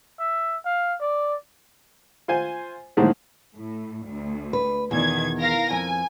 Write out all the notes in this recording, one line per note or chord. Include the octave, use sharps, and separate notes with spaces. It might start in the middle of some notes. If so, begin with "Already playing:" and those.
E5
F5
D5
F4 C5 G#5
A2 D3 D#3 F3 G#3 A#3
A2
D2
B4
E2 B2 D#3 G#6
A#4 F5 A#6
F2 G#5